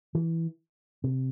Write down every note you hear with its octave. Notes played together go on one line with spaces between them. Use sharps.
E3
C3